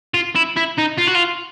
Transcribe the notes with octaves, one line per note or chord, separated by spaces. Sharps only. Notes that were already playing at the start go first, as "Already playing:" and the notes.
F4
E4
E4
D#4
F4
F#4
F4